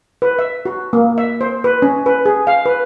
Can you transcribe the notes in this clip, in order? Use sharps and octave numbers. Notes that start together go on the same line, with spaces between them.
B4
E5
F#4
A#3
E5
C5
B4
C#4
B4
G#4
F5
B4